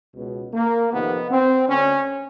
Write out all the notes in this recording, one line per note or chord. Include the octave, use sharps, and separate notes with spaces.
C#2 B2
A#3
F2 C3 D#3 B3
C4
D2 D3 C#4